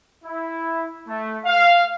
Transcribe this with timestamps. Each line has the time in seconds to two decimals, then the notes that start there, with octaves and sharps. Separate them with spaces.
0.25 E4
1.07 A3
1.45 F5